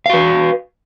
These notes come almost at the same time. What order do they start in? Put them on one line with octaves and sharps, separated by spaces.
F5 F#4 B4